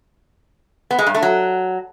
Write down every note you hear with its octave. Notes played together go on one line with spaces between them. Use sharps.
B3
G#3
G2
A3
F#3